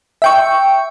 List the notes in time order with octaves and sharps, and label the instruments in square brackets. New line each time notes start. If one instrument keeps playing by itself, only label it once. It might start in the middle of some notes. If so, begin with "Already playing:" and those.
[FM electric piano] E5 G5 C#6